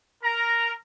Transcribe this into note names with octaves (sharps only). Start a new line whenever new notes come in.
A#4 A#5